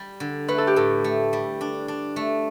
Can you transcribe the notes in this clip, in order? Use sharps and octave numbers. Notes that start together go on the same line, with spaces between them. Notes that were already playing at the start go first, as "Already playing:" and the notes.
Already playing: G3
D3
A3 B4
A4
G4
A2 A4
A3
G3
D4
D4
A3